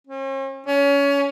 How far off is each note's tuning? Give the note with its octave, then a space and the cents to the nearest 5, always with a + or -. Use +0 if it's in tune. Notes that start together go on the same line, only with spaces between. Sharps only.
C#4 -45
C#4 +25